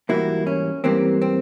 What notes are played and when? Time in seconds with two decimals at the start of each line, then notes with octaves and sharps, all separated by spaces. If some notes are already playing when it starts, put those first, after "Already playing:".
0.09 G#2 E3 G3 A#3 E4 F#4
0.47 C#4
0.84 G#2 E3 G3 A#3 C4
1.22 C4